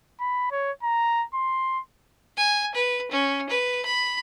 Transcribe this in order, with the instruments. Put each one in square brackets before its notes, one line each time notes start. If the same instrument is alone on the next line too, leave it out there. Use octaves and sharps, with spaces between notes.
[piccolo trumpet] B5
C#5
A#5
C6
[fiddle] G#5
B4
C#4
B4
B5